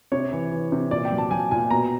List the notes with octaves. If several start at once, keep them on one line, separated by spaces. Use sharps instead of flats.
C3 C#5
E3
E3
C3
A#2 D5
G5
F#3
A5
F#3 G#5
A#2 G#5
B2 A#5